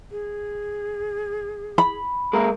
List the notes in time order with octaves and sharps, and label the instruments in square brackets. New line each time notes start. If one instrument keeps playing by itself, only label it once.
[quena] G#4
[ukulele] B5
[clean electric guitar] G#3 A#3 A#4 [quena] D#5